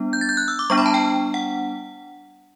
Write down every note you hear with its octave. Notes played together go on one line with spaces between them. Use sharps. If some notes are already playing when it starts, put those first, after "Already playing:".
Already playing: G3 B3 D4
G6
A6
G6
F#6
E6
D6
G3 B3 D4 C#6
B5
A5
G5
F#5